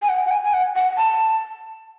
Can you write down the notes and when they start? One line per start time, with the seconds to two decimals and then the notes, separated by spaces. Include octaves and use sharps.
0.02 G#5
0.09 F#5
0.26 F#5
0.31 G#5
0.44 G#5
0.53 F#5
0.76 F#5
0.97 A5